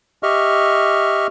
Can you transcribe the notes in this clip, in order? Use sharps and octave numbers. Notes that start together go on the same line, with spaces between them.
G4 D#5 E5 C#6 F6